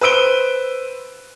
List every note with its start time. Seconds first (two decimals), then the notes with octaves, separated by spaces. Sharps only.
0.01 B4 C5 E6 D7 G7